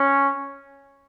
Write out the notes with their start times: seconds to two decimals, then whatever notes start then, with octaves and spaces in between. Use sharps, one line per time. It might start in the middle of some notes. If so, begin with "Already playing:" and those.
Already playing: C#4